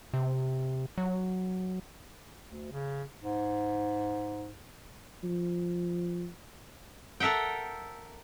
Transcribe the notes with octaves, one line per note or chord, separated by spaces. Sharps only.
C3
F#3
D2
C#3
G#2
F3
A4 A#4 E5 F#5 G5